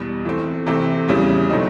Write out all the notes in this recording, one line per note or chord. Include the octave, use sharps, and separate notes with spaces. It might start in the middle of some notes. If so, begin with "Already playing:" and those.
Already playing: E2 B2 G3
E3 A3 C4
C3 E3 A3 C4
E2 C#3 E3 G3
B2 F#3 A3 C4 D#4